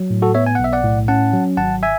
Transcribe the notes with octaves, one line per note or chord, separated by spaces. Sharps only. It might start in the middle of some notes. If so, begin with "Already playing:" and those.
Already playing: F#3
A2
F#4 A4
B3 C#5 E5
G#5
F#5
B1 E5
D5 F#5
A2
C#4 F#5 A5
F#3
G#1 F#5 A5
E5 G#5